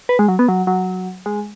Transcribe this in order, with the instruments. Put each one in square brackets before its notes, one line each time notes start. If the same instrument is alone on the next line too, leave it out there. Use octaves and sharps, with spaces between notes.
[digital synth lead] B4
G#3
F#3
B3
F#3
F#3
G#3